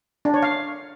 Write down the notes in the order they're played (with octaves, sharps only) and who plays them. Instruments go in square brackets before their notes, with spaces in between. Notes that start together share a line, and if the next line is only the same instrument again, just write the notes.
[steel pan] D4
C#5
F5